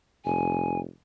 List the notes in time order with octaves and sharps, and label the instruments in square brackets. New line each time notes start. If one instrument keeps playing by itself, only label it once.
[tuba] F1 [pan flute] G#5